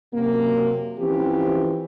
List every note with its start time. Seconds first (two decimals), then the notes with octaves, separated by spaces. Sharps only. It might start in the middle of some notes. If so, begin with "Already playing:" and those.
0.14 F#2 C3 A#3
0.99 E3 F3 C4 C#4 G4